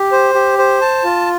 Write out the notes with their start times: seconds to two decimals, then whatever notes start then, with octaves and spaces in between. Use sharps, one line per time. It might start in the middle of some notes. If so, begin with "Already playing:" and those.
Already playing: G4
0.12 C5
0.34 G4
0.58 C5
0.81 A5
1.04 F4